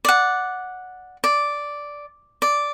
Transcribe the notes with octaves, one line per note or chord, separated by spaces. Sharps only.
D5 F#5
D5
D5